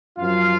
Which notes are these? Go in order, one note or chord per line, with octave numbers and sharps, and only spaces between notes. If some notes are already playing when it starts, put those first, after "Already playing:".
F#2 F3 F4 F5